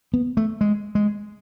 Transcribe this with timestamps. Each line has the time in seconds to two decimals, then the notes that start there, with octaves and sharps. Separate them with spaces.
0.14 B3
0.37 A3
0.61 G#3
0.95 G#3